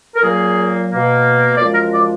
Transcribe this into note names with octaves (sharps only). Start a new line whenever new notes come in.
A#4
A#2 F#3 A#3 G#4
B2 A#3
F#2 F3 G#3 D5
A#4
D5